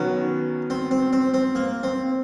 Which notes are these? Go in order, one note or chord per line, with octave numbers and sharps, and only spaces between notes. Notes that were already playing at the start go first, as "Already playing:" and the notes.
Already playing: D#3 F#3 B3 C#4
C4
C4
C4
C4
A#3
C4